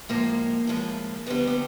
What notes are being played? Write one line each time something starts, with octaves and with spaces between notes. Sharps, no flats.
A2 F3 G#3 A#3
A2 F3 G#3
F2 D3 G3 B3
B3